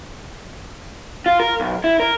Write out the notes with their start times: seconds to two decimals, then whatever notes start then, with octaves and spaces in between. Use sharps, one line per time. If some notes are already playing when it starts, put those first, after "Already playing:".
1.26 F4
1.39 A#4
1.60 B1
1.84 E4
2.00 A#4